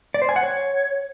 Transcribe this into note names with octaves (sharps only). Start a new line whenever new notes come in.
D5
C5
G#5
F#5
C#5